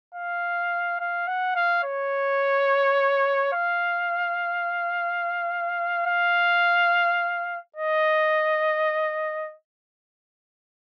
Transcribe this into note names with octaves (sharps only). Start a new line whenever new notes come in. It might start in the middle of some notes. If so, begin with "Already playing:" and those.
F5
F5
F#5
F5
C#5
F5
F5
D#5